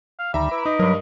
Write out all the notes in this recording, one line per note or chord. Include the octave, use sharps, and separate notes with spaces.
F5
D2 D#3 G3 E5 A#5
E4 B4 B5 D6
D#4 D#5
G2 F#3 A#4